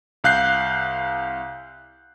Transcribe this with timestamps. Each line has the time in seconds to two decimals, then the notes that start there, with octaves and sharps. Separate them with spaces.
0.24 C2 F5 F#6 G6 C7